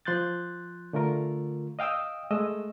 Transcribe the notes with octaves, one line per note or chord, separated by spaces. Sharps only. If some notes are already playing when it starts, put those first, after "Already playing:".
F3 C6 F#6 G6 A6
D3 A3 F4 A#4
D#5 F5 G5 D#6 E6
G#3 A3 D#5 E6